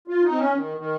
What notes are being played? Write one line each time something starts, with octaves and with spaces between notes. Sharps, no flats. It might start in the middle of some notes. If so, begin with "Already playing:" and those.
F4
D#4
C4
C#4
D#3
D#3